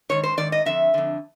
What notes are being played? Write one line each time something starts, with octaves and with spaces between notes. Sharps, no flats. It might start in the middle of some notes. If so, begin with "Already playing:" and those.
G#2 D#3 C#5
C5
G#2 D#3 D5
D#5
F2 D3 E5
F2 D3